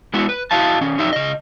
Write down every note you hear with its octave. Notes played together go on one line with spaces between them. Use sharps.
G#3 B3 E4 F#4
B4
E4 F#4 D#5 F5 A5
D#3 C#4
F2 F#3 D#4 G4 E5
C#3 D#5